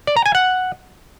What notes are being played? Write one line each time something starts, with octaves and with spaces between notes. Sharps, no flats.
D5
A#5
G#5
F#5